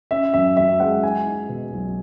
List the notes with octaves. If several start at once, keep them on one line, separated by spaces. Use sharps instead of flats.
C#4 E5
F#2 E5
F#2 E5
G#3 F#5
D#4 G#5
D#4
B2
B1